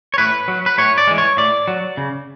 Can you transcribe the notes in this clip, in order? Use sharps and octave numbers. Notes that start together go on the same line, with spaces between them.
C#5
A2 B4
F#3
B4
A2 C#5
D5
E3 G#3
C#5
A2 D5
F#3
C#3